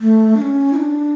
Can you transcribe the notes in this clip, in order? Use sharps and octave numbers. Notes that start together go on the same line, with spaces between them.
A3
D4
C#4
E4
D4